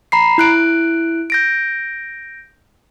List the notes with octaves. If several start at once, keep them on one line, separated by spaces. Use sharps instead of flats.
A#5 B5 C7
E4 F#6 D7
G6 A#6 D7